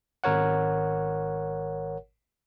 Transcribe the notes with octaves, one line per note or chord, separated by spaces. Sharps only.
G#1 A#4 C#5 F#5